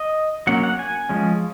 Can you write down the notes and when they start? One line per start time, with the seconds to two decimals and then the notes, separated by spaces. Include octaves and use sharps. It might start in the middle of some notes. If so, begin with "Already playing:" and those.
Already playing: D#5
0.47 F#3 A#3 C#4 F#5
0.63 F#5
0.79 G#5
1.09 F3 G#3 C#4